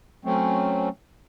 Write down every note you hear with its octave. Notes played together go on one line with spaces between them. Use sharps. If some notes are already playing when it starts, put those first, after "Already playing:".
F#3 A3 C4 C#4